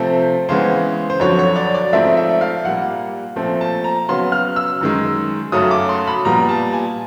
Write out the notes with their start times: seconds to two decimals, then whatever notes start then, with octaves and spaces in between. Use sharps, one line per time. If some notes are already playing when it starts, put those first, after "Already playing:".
Already playing: C3 F3 A3 C4 C5
0.49 C#3 E3 G#3 B3 C5
1.10 C5
1.20 F2 D3 F#3 C#5
1.39 C#5
1.56 D5
1.75 D5
1.93 G#2 F3 A3 C4 E5
2.17 E5
2.41 F5
2.64 A#2 G3 A#3 F#5
3.36 A#2 F3 A3 C4
3.61 A5
3.84 A#5
4.09 C#3 F#3 B3 C6
4.32 F6
4.56 E6
4.81 F#2 D#3 G#3
5.52 F#2 C#3 F#3 A3 D#6
5.71 D6
5.89 C6
6.07 B5
6.25 A#2 G3 B3 A#5
6.49 A5
6.73 G#5